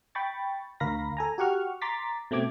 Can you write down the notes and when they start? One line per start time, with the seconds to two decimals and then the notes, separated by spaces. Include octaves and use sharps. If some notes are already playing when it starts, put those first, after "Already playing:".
0.15 G5 B5 C#6 A6
0.80 D2 A#4 F5 B5 A#6
1.17 A4 G#5 A#5
1.38 F#4 G4 F#5 C#6 F6
1.82 A#5 C6 D6 A6 B6
2.31 B2 A3 C4 D6 G#6